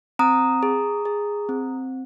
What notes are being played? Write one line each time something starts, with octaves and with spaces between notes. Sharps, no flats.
C4 A#5 D#6
G#4
G#4
C4